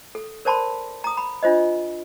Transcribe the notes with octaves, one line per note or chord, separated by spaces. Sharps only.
A4
A#4 C5 D5 A5 B5 C6
A#5 D#6
B5
D4 F4 C5 D#5